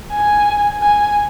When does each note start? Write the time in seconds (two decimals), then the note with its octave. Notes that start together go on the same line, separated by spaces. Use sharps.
0.13 G#5
0.82 G#5